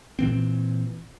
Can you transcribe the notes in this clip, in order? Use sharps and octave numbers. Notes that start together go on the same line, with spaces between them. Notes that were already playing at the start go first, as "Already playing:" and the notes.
A#2 E3 C4